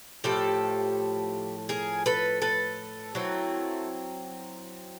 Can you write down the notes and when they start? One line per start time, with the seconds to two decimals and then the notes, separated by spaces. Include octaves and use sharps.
0.24 A2 F3 A3 G4 A4
1.69 G#4 A#4
2.06 A4 B4
2.42 A4 B4
3.15 F#3 A3 C4 E4